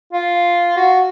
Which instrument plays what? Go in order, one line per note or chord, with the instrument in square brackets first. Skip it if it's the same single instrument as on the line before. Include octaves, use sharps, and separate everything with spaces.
[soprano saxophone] F4
F#4